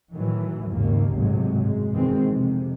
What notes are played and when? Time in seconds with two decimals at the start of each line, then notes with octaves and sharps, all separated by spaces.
0.14 A2 D#3 E3 F#3
0.69 G#1 D#2 C#3 A#3
1.14 G#1 C#2 A2 C3 F#3 G#3
1.61 F#2 G#3
1.91 B2 D#3 E3 G#3 C4
2.29 F2 C3